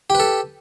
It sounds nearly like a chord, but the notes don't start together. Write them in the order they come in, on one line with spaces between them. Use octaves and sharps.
G4 B4 A4